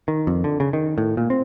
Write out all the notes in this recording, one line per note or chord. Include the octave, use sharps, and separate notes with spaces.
D#3
F2
D3
C#3
D#3
A2
A#2
C4